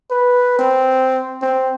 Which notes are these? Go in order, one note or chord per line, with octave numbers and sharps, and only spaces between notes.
B4
C4
C4